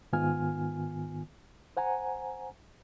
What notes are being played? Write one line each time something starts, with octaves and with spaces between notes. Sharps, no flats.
G#2 D#3 B3 F4 G#5 F6
C5 F#5 G#5 A#5